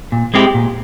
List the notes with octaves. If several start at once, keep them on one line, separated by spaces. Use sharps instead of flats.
A#2
G#3 C4 E4 G4
A#2